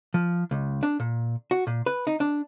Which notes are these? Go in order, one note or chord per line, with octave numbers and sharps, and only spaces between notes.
F3
C#2
D4
A#2
F#4
A#2
B4
D#4
D4